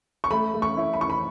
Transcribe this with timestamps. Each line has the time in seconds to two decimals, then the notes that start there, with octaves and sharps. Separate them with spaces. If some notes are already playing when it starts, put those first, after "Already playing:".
0.24 C#6
0.31 A3 B5
0.54 A3
0.62 C#6
0.77 E4
0.94 B5
1.00 E4 C#6
1.10 B5